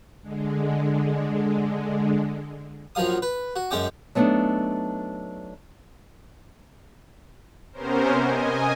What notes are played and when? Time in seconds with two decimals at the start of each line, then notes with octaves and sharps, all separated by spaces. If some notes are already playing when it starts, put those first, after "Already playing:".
0.22 D3 G#3
2.95 A#1 F3 F#3 F5 D#6
3.22 B4
3.56 F#4
3.71 F#2 G#3 C#4 G5 D6
4.15 F#3 A3 B3 C4 D4 D#4
7.73 C3 B3 C#4 A#4 C5
8.22 D#5 G#5